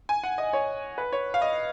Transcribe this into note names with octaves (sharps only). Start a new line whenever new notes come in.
G#5
F#5
D#5
C#5
B4
C#5
F5
D#5